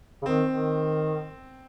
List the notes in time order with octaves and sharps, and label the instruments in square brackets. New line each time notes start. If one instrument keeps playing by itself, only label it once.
[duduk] C#3
[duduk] D#3 [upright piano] C4
[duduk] D#3